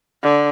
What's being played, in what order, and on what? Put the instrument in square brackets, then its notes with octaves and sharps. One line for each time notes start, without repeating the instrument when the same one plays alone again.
[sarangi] D3